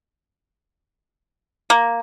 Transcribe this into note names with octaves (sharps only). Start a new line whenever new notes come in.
A#3